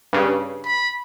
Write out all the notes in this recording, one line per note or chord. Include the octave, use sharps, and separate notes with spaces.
G2 C#3
B5